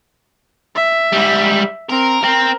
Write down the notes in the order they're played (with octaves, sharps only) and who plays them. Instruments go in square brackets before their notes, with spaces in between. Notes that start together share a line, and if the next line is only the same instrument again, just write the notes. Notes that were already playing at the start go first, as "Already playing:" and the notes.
[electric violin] E5
[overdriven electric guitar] G#2 G3
[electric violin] C4 [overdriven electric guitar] A#4
[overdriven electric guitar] C4 [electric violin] A#4